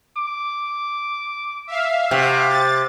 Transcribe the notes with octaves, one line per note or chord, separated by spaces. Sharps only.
D6
E5 F5
C3 F#4
C4 A6